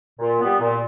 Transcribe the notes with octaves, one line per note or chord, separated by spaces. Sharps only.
A#2
G3 B3
A#2